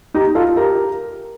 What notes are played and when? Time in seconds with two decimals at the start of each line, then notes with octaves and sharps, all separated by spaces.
0.14 D#4 G4
0.35 F4 A4
0.56 G4 A#4